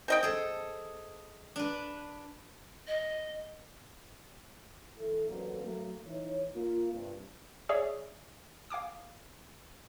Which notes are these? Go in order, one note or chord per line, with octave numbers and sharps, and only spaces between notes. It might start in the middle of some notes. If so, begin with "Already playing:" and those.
C4 D#5 G5
G#4 A4
D4 B4
D#5
E3 E4 A4
A1 F2 D3 F#3 A#3 B4
F#3 A3 A#3
E3 D#4 E4 C#5
A#3 F4
G2 C3
G#4 C#5 D5 E5
F5 G#5 D6 D#6